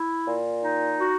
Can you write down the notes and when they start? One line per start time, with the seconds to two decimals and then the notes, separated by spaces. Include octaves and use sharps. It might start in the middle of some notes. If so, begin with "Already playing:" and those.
Already playing: E4
0.28 A#2
0.64 D#4
1.00 F#4